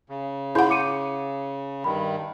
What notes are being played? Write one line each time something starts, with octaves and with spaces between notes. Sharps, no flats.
C#3
E4 G#4 F#5 C6 G6
D6 C#7 D#7
G2 D#3 B5